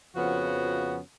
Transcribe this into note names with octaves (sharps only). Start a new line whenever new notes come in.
F2 C#3 F3 B3 C#4 F#4